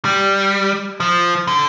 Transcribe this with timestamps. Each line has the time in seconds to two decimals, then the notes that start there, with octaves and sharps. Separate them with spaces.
0.05 G3
1.00 F3
1.48 D3